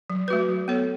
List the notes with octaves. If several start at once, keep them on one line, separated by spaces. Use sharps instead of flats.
F#3
A3 F#4 B4
F#3
B3 A4 C#5